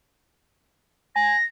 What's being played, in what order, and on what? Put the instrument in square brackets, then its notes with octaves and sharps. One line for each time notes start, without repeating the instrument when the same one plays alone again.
[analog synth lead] G#5 [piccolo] A#6